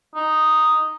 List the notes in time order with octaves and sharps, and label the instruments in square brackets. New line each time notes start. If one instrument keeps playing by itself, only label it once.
[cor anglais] D#4